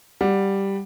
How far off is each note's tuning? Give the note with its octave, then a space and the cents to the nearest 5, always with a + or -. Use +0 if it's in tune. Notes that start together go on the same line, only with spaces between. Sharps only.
G3 +0 F#5 -5